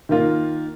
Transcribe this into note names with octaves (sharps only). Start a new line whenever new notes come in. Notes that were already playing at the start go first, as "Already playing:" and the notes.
D#3 A#3 F4